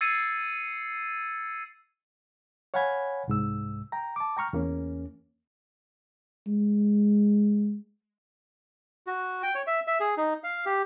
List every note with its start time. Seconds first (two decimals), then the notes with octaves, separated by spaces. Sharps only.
0.01 E6 G#6 A6 C7 C#7 D#7
2.74 C#5 F5 F#5 G#5 B5 G#6
3.28 C2 G#2 E6
3.92 G5 A#5
4.16 A5 D6
4.37 G5 A#5 C#6 F6
4.53 E2 A#3 C#4
6.47 G#3
9.07 F#4
9.43 G5
9.55 C#5
9.67 E5
9.87 E5
10.00 G#4
10.17 D#4
10.44 F5
10.66 G4